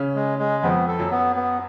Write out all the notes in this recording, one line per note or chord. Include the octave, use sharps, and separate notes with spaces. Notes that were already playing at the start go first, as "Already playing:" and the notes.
Already playing: C#3 C#4
G#3
G#3
F2 F3 B3
A4
F#2 F#3
B3
B3